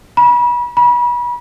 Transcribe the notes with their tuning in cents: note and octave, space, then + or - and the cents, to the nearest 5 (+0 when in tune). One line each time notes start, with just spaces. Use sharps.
B5 -35
B5 -35